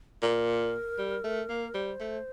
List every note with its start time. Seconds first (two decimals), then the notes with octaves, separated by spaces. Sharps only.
0.22 A#2 A#4
0.98 G3
1.24 A3
1.49 A#3
1.74 G3 C5
2.00 A3